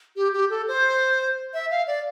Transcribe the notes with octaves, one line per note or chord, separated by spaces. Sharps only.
G4
G4
A4
C5
E5
F5
D5